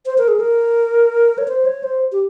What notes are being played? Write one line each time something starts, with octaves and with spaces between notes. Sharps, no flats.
C5
A#4
G#4
A#4
C#5
C5
C#5
C5
G4